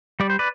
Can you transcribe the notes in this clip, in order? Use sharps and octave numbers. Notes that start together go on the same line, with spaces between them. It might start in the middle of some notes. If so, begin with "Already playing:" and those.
G3 D5
C5
B4 D5